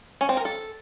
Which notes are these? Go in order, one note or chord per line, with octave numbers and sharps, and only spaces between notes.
C#4
C4
A#4
A4